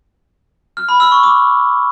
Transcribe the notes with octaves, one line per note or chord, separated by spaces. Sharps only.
F6
B5
E6
C#6
D6